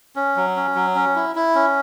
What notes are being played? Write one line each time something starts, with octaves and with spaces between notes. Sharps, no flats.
C#4
F#3
C#4
F#3
C#4
E4
E4
C#4